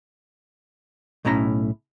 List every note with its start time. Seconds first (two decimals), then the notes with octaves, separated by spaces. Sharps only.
1.25 B1 A2 C#4 E4 A#5